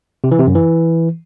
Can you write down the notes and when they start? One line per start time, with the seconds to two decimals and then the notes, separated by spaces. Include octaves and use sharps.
0.24 C3
0.32 E3
0.39 C3
0.47 F#2
0.55 E3